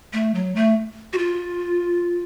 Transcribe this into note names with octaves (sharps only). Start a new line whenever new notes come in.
A3
F#3
A3
F#4
F4